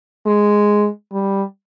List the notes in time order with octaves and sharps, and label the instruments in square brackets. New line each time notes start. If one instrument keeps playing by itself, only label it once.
[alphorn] G#3
G3